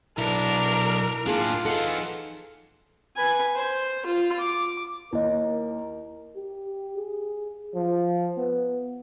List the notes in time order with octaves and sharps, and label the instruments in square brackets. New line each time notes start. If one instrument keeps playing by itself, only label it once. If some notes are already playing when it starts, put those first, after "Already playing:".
[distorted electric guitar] B1 [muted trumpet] D4 [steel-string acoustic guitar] E4 [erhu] A#4
[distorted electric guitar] A2 D4 [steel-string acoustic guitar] A#3 G#4 [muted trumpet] F4
[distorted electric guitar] E3 F#5 [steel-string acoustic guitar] D#4 G#4 A4
[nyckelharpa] B4 G#5
C5
F4
D6
[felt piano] D#2 [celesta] E4 D#5 [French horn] A#4
[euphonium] G4
G#4
F3
B3